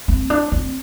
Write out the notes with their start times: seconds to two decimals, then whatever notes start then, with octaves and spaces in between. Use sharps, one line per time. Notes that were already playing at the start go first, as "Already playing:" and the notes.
0.08 C4
0.30 D4
0.52 C4